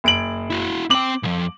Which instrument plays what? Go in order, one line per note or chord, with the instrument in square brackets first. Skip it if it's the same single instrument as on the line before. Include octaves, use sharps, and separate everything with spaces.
[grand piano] F#1 D7 F#7
[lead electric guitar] E4 F#4
[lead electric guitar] C4 G5 [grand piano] D6 F#7
[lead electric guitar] C2 F2